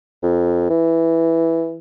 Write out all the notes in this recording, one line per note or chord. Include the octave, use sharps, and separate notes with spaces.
F2
E3